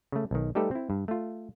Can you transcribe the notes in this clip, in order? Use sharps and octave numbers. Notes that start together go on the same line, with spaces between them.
C#3 A3
B1 D#3
G3 A3 D#4 G4 A4 B4
C4 E4
G2
A3 F4